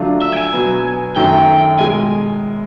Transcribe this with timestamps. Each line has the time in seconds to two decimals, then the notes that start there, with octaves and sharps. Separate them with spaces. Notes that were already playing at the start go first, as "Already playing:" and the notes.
Already playing: D3 F#3 A3 D4 F4
0.22 E5
0.33 G5
0.37 G#5
0.53 B2 F#3 B3
1.16 F#2 D#3 F#3 A3 G5
1.80 B2 G#3 G#5